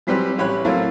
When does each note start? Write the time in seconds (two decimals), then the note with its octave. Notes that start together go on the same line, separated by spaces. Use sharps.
0.07 E3 F#3 G3 C4 G4 B4
0.38 A1 G4 C#5 B5 F#6
0.65 A2 F#3 A3 A#3 C4 E4